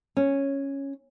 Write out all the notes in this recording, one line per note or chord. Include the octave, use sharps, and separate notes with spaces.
C#4